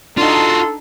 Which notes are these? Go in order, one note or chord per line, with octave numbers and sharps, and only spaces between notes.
D4 D#4 F4 F#4 A4 C6